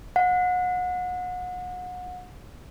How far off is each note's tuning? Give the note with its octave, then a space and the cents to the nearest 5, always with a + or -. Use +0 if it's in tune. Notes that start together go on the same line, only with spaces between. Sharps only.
F#5 -35